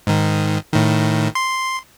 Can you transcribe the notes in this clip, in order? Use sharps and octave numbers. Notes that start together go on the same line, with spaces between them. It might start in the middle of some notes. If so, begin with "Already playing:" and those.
G#2 D#3
A2 D#3
C6